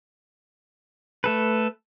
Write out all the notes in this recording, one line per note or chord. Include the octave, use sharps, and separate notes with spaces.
A3 A4 B4